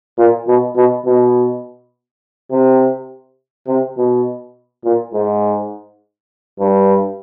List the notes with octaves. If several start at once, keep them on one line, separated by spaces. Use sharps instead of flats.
A#2
B2
B2
B2
C3
C3
B2
A#2
G#2
G2